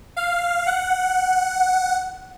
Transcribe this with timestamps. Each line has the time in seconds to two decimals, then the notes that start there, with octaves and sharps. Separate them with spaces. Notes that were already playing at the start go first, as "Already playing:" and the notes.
0.17 F5
0.67 F#5